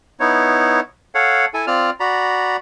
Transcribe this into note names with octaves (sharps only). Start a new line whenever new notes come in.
B3 D#4 E4 C#5
A4 C#5 F5 F#5
E4 A4 G#5
C4 F4 D5 F6
F#4 D5 A#5 B5